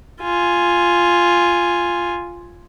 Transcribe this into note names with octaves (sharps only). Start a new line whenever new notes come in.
F4 G#5